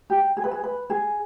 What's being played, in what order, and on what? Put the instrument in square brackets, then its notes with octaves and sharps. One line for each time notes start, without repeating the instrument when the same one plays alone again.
[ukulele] G4
G#4
B4
G#4
B4
G#4